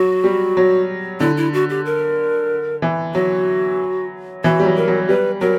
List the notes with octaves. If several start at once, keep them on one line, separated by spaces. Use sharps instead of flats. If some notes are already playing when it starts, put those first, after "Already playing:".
Already playing: F#3 F#4
G3
F#3
D3 E4
E4
F#4
G4
A#4
E3
F#3 F#4
E3 F#4
G3
F#3
A#4
F#3
G3 B4
F#3 A#4